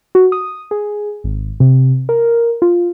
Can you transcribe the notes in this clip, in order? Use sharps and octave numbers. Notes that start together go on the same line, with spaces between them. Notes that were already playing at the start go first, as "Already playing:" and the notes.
F#4
D#6
G#4
G#1
C3
A#4
F4